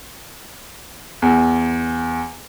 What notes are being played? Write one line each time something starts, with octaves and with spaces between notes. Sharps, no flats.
E2